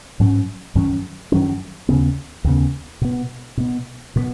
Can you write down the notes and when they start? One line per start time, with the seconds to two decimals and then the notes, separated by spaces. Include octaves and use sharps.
0.20 G#2 F#3 C#4
0.75 F#2 D#3 F#3 C#4
1.32 F#2 D#3 F#3 C#4
1.89 D#2 C#3 B3
2.44 D#2 C#3 B3
3.01 B2 B3
3.57 B2 B3
4.16 B2 F#3 B3